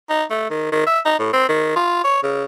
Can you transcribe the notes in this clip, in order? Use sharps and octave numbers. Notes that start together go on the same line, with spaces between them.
D#4
A3
D#3
D#3
E5
D#4
A2
C4
D#3
F4
C#5
C#3